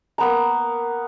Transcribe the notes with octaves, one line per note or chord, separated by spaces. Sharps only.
A#3 B3 A#5